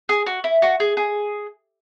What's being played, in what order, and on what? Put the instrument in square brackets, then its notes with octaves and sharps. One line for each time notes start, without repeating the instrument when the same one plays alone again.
[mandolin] G#4
F#4
E4
F#4
G#4
G#4